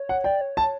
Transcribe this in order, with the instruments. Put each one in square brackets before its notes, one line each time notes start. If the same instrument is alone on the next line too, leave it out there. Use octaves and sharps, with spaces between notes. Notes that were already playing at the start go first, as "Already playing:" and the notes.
Already playing: [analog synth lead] C#5
[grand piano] F#5
[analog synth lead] D5 [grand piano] G5
[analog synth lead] C#5
[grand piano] A5